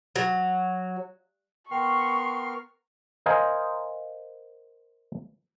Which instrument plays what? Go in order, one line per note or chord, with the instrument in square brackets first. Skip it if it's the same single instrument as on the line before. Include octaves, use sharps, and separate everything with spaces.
[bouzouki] F#3
[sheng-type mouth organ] B3 A#4 F6 [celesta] G5 [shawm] C6 [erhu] C#6
[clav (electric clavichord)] A#4 C5 D#5 F5 G#5